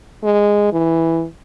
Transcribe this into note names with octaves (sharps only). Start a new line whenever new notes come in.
G#3
E3